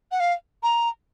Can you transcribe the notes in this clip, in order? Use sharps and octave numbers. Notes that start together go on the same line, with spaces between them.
F#5
F5
A#5